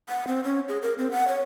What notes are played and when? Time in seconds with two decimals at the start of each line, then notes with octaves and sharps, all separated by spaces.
0.09 F#5
0.27 C4
0.44 C#4
0.69 G#4
0.82 A#4
0.98 C4
1.11 F#5
1.28 C#5